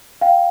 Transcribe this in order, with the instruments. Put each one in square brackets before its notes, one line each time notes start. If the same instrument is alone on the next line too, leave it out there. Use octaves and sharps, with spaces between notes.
[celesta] F5 G5